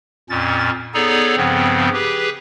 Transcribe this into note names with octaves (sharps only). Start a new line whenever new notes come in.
F2 A#2 C#4 A6
B3 D#4 G#4 A4 C#5 D5
G2 C#3 F3 B3 C4
G4 G#4 B4